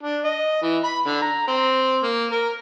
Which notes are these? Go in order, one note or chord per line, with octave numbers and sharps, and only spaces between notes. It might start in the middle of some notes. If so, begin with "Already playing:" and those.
D4
D#5
E3
B5
D3
A#5
C4
A#3
A#4